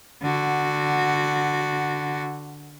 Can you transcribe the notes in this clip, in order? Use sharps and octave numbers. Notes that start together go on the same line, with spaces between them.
D3 F#4